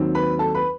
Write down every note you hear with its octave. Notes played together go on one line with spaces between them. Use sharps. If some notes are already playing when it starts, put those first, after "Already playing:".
Already playing: D#2 D#3 F#3 C4
B4 B5
A4 A5
B4 B5